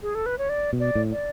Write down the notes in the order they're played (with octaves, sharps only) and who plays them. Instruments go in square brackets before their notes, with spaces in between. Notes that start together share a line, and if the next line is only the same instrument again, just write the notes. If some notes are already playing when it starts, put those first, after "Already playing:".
[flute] G#4
A4
B4
C#5
D5
[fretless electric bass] B2
[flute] D5
[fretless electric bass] A2
[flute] D5